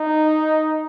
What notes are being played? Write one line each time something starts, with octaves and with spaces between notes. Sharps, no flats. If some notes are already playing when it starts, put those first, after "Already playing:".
Already playing: D#4